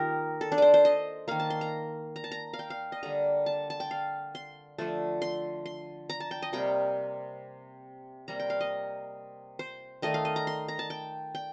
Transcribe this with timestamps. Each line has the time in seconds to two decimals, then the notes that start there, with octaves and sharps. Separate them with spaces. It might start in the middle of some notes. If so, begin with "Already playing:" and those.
Already playing: D#3 A#3 D#4 F4 G4 A#4
0.41 A4
0.52 D4
0.58 C5 D5
0.74 C5
0.85 D#5
1.28 D#3 A#3 F5
1.39 A5
1.50 C6
1.61 A#5
2.16 A#5
2.24 A5
2.32 A#5
2.53 F5
2.59 G5
2.70 F5
2.92 D#5
3.03 D3 G3 A#3 A#5
3.46 A5
3.70 A5
3.80 G5
3.91 F5
4.35 C6
4.78 D3 F3 A3
5.22 C6
5.66 C6
6.10 A#5
6.20 A5
6.31 G5
6.42 D#5
6.53 C3 G3 A#3 G5
8.28 C3 G3 A#3 A#5
8.40 G5
8.50 F5
8.61 D#5
9.59 C5
10.02 D#3 A3 D#5
10.14 F5
10.25 D#5
10.36 A#5
10.47 C6
10.68 A#5
10.79 A5
10.90 G5
11.35 G5